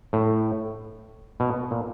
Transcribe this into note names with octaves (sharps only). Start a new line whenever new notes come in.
A2
B2
A#2